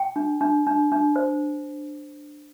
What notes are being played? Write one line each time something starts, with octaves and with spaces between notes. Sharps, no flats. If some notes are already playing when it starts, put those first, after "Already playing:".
Already playing: G5
D4
D4
D4
D4
C5